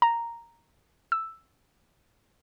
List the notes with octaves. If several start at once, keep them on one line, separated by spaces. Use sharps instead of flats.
A#5
E6